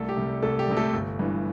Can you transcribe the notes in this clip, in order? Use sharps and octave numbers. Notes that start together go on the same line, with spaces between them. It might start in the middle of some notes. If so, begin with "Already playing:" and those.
Already playing: C2 A3 A4
G4
C3 G3
C2 A3 A4
G4
C3 G3
A3 A4
G1
G2 E3